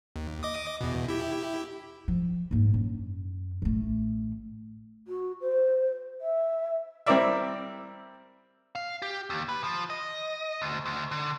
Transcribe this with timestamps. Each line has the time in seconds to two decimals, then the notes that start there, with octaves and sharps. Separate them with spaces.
0.16 D#2
0.43 D#5 D6 D#6
0.81 E2 B2
1.08 E4 G4
2.08 F3
2.51 G#2 A#3
2.74 F#2
3.62 A1 A3
5.08 F#4
5.41 C5
6.21 E5
7.06 G3 C4 E4 A#4 D5 E5
8.75 F5
9.02 G4
9.30 D#2
9.49 B4
9.64 F3
9.90 D#5
10.62 D2
10.86 D2
11.11 D3